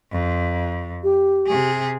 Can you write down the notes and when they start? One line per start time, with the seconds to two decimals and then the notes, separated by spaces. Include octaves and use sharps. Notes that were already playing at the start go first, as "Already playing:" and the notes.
0.12 F2
1.03 G4
1.47 C3 G#4